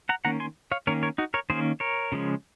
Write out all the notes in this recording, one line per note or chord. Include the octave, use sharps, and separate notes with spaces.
F#5 A#5
D#3 A#3 C#4 F#5 A#5
G#5 C6
C#5 F5
D#3 A#3 C#4 A#4 C#5
A#4 C#5
D#4 F#4
A#4 C#5
D#3 A#3 C#4 G#4 C5
A#4 C#5
C#3 F3 G#3 C#4